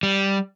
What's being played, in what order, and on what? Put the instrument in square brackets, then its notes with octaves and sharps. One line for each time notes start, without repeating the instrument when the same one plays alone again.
[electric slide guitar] G3